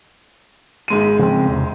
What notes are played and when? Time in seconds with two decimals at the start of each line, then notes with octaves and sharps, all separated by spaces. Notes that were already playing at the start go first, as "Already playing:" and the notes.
0.88 G#1 G#3 D#7
1.19 C#3 F3 C4
1.48 E2 C3